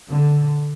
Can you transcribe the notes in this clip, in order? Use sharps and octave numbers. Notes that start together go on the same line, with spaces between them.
D3